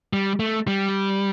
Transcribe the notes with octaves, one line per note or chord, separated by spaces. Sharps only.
G3
A3
G3